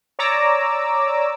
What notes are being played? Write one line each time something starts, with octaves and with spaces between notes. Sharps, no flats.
C#5 D5 A#5 D6 E6